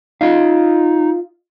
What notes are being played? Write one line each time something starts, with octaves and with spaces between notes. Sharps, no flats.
D#4 F4 D#5 F5